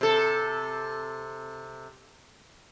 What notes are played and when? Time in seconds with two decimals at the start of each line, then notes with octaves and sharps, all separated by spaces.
0.01 C3 A4